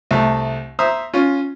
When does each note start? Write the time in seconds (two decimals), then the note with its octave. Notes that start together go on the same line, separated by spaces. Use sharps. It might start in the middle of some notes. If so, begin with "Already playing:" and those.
0.11 C2 A3
0.79 C5 E5 A#5 D#6
1.14 C#4 F4